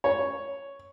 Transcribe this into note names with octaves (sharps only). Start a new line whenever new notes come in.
C#5